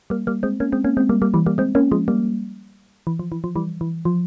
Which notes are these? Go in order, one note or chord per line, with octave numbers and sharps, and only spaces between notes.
G3 A#3
G3 A#3
G#3 C4
A#3 C#4
G#3 C4
A#3 C#4
G#3 C4
G3 A#3
G3 A#3
E3 G3
G3 A#3
G#3 C4
A#3 C#4
F3 G#3
G3 A#3
E3
F3
E3
F3
E3 G3
E3
F3